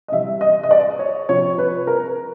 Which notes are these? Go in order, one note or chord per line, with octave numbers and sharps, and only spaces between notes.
D#5
C3 E3 G3 E5
D#5
D#5
D5
C#5
C3 F3 C#5
B4
A#4